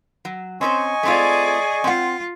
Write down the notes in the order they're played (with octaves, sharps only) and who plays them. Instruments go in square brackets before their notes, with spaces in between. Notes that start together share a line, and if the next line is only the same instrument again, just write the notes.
[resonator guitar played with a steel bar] F#3
[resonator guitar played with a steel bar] C4 C#4 C5 [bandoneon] D#5 G#5 C#6
[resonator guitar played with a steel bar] A3 C4 F4 [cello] G#4 D5
[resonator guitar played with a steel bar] C4 F#5 [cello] F4